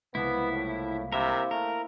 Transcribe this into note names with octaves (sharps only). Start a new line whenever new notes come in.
C2 C#3 F3 G#3 A#3 B3 E4
A2
C3 E4 A#4 E5 F5
A3 A#4